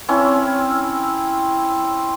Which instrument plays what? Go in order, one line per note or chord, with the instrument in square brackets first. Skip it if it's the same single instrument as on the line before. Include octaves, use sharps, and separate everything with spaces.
[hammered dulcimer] C4 C#4 E4